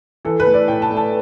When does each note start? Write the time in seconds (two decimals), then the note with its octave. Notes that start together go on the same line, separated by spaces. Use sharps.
0.25 E3 A4
0.40 B4
0.47 A3
0.54 D5
0.67 A2 G5
0.82 A5
0.90 A3
0.97 A5